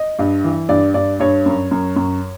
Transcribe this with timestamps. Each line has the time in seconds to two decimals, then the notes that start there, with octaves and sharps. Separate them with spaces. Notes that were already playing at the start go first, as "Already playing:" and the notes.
Already playing: D#5
0.19 G2
0.44 E3
0.69 G2 D5
0.94 G2 D5
1.20 G2 C#5
1.46 F#2
1.71 F#2
1.96 F#2